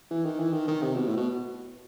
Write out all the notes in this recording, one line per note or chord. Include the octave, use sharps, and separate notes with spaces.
E3
D#3
E3
D#3
D#3
C3
B2
A2
B2